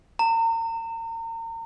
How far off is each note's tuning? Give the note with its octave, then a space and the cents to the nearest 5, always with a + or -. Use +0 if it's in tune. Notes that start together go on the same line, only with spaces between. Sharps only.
A#5 -35